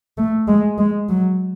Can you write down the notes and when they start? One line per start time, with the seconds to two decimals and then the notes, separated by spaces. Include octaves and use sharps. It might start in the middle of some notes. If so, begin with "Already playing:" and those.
0.18 A3
0.48 G#3
0.78 G#3
1.09 F#3